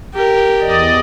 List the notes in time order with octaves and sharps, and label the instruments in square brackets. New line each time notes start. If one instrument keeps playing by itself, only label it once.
[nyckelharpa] G4 A#4
[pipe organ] E2 D5 D#5